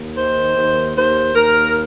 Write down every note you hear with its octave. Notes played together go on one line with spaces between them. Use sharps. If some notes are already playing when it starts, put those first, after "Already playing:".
Already playing: D#2
D#3 C5
D#2
D#2 C5
D#2 A#4